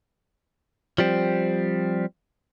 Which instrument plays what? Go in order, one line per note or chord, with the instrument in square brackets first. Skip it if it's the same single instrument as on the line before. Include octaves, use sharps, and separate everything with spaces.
[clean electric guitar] F3 G3 C4